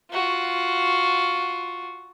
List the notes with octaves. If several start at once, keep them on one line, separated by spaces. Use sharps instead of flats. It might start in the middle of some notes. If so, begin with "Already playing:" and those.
F4 F#4